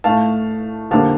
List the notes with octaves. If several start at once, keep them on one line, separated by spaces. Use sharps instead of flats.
A2 A3 F5 A5
F2 D3 G3 A#3 F5 A5